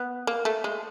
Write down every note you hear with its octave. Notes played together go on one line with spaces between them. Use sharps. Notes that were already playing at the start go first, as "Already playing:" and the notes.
Already playing: B3
A#3
A3
G#3